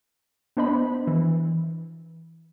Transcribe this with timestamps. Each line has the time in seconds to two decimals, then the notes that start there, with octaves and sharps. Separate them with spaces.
0.57 B3 D4 C5 D#5 B5
1.07 E3